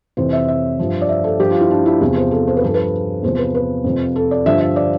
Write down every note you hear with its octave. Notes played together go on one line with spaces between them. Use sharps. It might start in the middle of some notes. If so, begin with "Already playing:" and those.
F2 C3 E3 C5
E5
E5
G2 F3
D5
E5
A4
G2 F3 G4
F4
E4
D4
E4
E2 C3 F3
C5
A4
C5
B4
G2 F3 A4
B4
E2 C3 F3 C5
B4
B4
F2 C3 F3
A4
D5
G2 D3 F3 E5
E5
D5